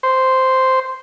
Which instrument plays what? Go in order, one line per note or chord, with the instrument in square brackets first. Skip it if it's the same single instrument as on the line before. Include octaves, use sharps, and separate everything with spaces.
[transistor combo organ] C5